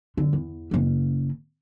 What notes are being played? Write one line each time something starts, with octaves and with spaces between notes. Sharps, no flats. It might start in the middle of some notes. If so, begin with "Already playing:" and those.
F#2 D3
E2
F#1 C#3